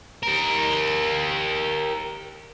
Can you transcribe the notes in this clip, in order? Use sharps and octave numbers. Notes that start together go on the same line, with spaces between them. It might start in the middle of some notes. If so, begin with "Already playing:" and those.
G4 A#4